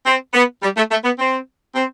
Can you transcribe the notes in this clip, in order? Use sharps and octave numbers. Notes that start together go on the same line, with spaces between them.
C4
B3
G3
A3
A3
B3
C4
C4